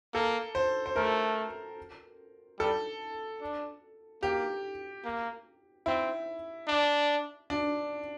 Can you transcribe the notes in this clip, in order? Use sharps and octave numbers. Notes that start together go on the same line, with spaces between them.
A#3 A4
C5
C5
A3 A#4
G3 A4
D4
A#3 G4
A#3
C4 E4
D4
D4